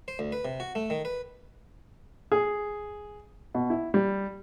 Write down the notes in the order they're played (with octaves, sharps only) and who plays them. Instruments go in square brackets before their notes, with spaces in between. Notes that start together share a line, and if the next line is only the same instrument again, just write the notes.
[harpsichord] C5
D2
B4
C3
F#4
A3
D#3
B4
[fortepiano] G#4
B2
E4
G3